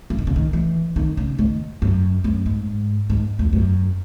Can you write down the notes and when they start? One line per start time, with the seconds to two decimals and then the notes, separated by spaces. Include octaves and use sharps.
0.10 E3
0.19 D#3
0.27 C#3
0.36 D#3
0.53 E3
0.96 D#3
1.17 C#3
1.39 D#3
1.82 F#2
2.24 F#2
2.46 G#2
3.10 G#2
3.39 E2
3.53 F#2